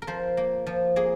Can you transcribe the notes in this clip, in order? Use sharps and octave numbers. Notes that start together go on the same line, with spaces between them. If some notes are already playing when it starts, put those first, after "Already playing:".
A#4
F3 C5
A#3
F3
A#3 G#4